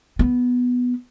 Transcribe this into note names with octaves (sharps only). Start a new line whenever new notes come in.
B3